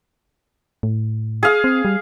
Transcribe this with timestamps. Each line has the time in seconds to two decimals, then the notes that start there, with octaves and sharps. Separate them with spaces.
0.83 A2
1.43 G#4 F5
1.64 C4
1.85 G3